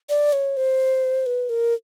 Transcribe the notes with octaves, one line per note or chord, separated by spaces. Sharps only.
D5
C#5
C5
B4
A#4